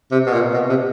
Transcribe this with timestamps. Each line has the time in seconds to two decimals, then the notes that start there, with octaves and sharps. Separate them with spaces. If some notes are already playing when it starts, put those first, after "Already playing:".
0.11 C3
0.27 B2
0.33 A#2
0.54 B2
0.69 C3